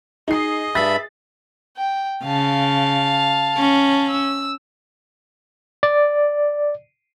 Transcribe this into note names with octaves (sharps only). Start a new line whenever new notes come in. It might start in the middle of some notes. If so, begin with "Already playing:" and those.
D#4 G#4 D#5 C7
G2 E5 B5 A6
G5
C#3 F5 A5
C#4
E6
D5